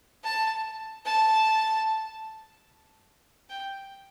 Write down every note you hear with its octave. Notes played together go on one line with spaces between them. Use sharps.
A5
A5
G5